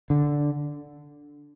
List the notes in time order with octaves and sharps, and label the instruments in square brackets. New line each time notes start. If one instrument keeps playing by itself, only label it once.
[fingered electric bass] D3